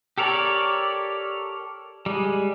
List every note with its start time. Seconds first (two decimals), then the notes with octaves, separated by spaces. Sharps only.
0.18 G4 A4 A#4 C#5 D5
2.06 G3 G#3